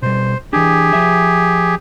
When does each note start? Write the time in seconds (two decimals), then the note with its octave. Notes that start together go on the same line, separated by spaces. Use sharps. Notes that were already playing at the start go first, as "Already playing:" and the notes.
0.02 B2 G3 C5
0.53 E3 D4 G4 G#4
0.93 F3 E5